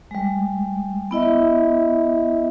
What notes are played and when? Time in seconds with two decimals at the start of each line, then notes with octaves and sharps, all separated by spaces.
0.11 G3 G#3
1.11 B3 E4 D#5 E5